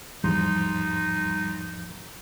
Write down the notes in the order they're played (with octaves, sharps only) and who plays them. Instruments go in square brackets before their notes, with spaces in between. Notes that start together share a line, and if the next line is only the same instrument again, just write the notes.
[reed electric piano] E2 G#2 F3 [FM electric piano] G3 C6 [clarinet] D#4